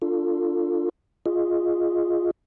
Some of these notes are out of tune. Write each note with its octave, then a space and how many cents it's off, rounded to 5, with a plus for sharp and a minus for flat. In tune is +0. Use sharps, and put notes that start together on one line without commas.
D4 +5 F4 +0 A4 +20
F4 +0 G#4 +0 D#5 +0